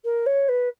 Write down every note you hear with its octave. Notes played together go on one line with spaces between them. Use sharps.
A#4
C#5
B4